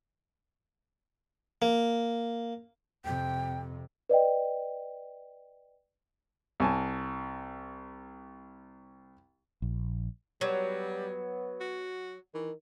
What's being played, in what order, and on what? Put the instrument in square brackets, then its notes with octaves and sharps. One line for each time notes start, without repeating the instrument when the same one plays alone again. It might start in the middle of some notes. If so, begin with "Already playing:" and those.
[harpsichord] A#3
[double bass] F2 C3 [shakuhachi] G5
[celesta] B4 D5 D#5 G5
[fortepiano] C2 G#5 A5
[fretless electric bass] A#1
[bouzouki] F#3 [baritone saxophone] G3 [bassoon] B3
[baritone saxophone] F#4
[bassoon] D#3 [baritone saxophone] E3